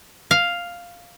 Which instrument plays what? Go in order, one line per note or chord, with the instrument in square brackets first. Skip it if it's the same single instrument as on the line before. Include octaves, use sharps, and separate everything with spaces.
[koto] F5